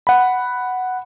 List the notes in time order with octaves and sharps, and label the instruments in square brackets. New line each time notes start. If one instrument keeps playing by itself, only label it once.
[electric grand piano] F#5 B5